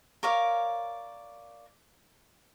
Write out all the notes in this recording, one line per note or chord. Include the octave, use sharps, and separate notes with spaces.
A#4 C#5 D5 F5